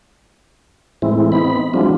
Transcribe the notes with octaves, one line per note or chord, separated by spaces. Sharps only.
A2 E3 G#3 C4 E4
B3 C4 D#4 B5
E3 F#3 G#3 C4 D4 F4